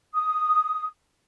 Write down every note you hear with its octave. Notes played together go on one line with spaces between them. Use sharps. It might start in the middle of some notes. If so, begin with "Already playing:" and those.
D#6